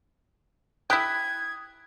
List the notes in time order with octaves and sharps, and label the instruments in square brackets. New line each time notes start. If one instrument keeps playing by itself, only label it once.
[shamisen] E4 G4 [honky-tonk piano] D#6 F#6 B6 [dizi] G#6